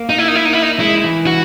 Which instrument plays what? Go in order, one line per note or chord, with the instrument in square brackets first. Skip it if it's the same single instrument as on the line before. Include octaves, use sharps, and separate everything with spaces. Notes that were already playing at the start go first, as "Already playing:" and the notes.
Already playing: [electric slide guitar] A#3
[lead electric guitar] D#4
E4
D#4
E4
D#4
E4
D#4
[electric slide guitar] G#3 [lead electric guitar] E4
[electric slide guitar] E3
[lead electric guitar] F#4